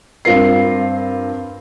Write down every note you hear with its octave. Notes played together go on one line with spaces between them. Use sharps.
G2 C4 F4 A#4 C7